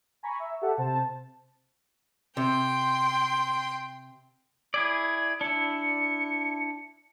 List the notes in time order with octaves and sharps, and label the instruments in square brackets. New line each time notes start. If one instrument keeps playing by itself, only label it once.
[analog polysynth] G#5 A#5 B5 C#6
E5
G4 A4 E5 F#5 A5
C3 C5 A5
[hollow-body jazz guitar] C3 [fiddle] G5 C6
[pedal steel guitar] E4 G#4 D5 [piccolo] G#6
[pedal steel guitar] D4 E4 [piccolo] C#7